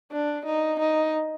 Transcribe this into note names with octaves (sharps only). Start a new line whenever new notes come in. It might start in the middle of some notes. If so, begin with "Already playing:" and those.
D4
D#4
D#4